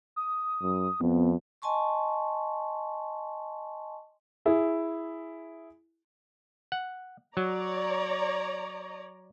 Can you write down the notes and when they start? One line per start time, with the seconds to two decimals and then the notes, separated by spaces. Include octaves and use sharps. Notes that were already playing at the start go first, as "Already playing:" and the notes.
0.16 D#6
0.62 F#2
1.01 F2 B3
1.62 D#5 G#5 A5 C6 C#6
4.46 E4 G#4
6.72 F#5
7.37 F#3 C#5 D5 A#5